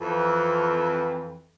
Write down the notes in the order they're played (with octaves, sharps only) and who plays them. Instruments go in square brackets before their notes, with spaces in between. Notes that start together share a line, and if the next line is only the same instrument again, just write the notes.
[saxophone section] F2 E3